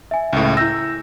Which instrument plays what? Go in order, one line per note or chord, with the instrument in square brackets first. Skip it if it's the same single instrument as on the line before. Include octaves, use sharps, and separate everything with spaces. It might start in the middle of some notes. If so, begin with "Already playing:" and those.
[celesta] E5 G#5
[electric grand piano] C#2 A2
[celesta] E4 G6 A#6 [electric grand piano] E6